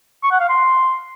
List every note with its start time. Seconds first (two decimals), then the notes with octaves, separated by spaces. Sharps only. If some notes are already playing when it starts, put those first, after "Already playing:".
0.23 C#6
0.32 F#5
0.40 F5
0.49 C6